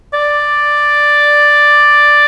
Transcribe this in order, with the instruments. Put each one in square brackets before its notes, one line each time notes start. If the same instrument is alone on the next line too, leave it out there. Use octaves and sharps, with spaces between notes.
[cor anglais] D5